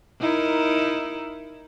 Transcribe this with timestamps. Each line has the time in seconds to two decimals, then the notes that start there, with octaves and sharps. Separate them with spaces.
0.20 D#4 E4 A#4